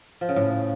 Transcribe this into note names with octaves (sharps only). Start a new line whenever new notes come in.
F3
C#3
A2